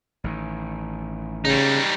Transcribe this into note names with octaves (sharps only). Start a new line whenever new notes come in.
A1 D#3
C#3 G3 D#4